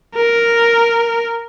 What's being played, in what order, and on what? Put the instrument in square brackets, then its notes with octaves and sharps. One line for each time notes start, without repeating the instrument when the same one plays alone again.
[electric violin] A#4